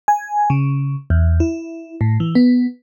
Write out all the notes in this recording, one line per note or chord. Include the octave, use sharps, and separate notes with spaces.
G#5
C#3
E2
E4
A2
E3
B3